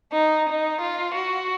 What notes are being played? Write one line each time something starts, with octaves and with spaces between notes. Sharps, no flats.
D#4
D#4
F4
F#4